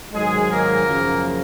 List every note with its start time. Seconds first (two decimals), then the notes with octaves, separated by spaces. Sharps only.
0.13 G#2 D#3 F#3 G#3 G#4
0.49 A#3 A#4
0.85 F#2 C#3 F3